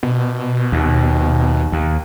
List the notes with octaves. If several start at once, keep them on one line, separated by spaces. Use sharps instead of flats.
B2
D#2
D#2